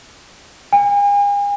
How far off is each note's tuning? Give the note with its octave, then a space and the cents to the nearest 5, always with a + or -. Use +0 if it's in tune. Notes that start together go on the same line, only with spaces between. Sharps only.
G#5 -40